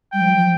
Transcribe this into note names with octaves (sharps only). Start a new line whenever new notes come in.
G3 G5
F3
F3